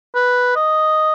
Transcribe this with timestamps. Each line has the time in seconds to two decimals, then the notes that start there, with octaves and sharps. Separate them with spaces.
0.15 B4
0.56 D#5